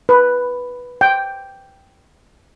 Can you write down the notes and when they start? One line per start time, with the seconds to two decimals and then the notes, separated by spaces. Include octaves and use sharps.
0.09 B4
1.01 G5